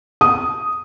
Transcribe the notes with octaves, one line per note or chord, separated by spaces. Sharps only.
D#6